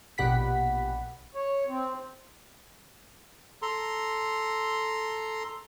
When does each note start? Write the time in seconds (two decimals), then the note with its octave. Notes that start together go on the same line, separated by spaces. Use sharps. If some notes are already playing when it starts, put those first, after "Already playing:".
0.18 A#1 B2 G4 F#5 B5 B6
1.35 C#5
1.68 C4
3.62 A4 A#5 C6